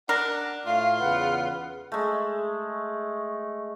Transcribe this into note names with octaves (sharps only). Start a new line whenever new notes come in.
D4 A#4 F#5
A2 A3 F4 F5
E2 C#3 B4 F#5
G#3 A3